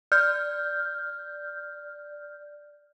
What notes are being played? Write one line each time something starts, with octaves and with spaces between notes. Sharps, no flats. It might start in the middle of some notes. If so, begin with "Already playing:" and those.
D5 F6 G6